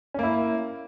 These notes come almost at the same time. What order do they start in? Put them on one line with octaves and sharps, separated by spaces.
C#4 A#3 E4